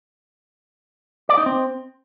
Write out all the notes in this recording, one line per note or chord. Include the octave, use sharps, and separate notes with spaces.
D5
D#4
C4